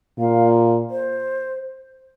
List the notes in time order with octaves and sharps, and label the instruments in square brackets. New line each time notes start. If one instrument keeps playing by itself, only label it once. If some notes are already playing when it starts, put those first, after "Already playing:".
[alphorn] A#2 [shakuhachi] F5
[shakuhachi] C5